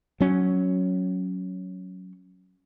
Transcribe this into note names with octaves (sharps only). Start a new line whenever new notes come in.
F#3 C#4